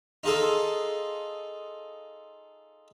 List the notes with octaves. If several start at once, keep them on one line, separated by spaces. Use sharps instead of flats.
D#4 F4 G#4 A4